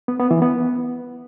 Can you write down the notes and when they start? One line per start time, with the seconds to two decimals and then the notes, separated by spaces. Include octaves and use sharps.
0.08 B3
0.19 B3
0.31 E3
0.42 B3